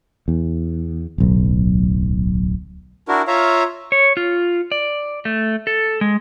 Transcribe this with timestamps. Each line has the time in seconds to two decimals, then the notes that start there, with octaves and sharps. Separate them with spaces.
0.28 E2
1.18 D1 B1
3.08 D4 E4 F#4 A#4
3.27 F4 C#5 E5 F5 A#5
3.92 C#5
4.17 F4
4.72 D5
5.25 A3
5.67 A4
6.01 G#3